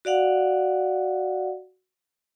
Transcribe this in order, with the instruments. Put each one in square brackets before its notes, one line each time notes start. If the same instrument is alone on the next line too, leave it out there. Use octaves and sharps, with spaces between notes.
[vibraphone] F#4 D5 F5 F#5